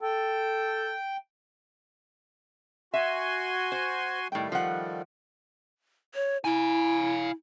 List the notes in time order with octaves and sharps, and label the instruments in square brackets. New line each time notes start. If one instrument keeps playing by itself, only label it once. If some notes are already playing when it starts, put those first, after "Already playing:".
[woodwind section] A4 [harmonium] G5
[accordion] F#4 G#5 C6 [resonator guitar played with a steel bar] E5
[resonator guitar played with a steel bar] C5
[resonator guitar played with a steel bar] A2 G5 [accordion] D#3 G3 A3
[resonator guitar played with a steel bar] F3 F#5
[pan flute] C#5
[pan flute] E4 [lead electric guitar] F5 G#5